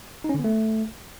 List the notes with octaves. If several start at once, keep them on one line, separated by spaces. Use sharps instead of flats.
D#4
C#4
D3
B3
A3